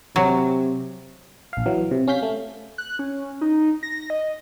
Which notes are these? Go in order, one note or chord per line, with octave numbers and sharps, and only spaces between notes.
C3 F#3
A#1 F5
E3 F#3
C3
C#4 F5 G6 B6
A3
F#6
C#4
D#4
A#6
D#5